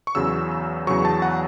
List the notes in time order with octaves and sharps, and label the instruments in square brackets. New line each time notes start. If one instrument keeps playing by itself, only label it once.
[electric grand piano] C#6
E2 C#3 F#3 E6
E2 C#3 F#3 C#6
A5
F#5